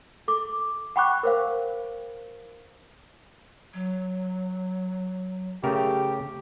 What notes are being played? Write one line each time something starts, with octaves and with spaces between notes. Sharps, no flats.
A4 D6
F#5 G5 B5 C#6 D6 F#6
A#4 C5 F5
F#3
C#3 A3 G4 A#4